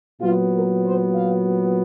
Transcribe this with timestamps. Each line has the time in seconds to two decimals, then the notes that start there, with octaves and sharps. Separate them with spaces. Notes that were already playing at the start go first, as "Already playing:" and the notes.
0.21 A#2 F#3 B3 F4
0.52 A#4
0.84 C5
1.15 F5